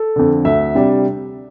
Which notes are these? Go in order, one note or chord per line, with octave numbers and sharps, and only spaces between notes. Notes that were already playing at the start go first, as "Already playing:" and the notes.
Already playing: A4
F2 D3
D2 E5
C3 G3 D4